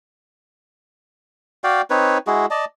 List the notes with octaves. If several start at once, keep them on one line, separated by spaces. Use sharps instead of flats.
F#4 D5 F5 G5
C4 D#4 B4 C#5
G#3 E4 F#4 G#4
D5 D#5 A5